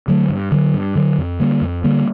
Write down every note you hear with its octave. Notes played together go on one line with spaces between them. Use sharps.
D3 F#3 A3
G2
D3 F#3
G2
D3 F#3
F2
D3 G3 A#3
F2
D3 G3 A#3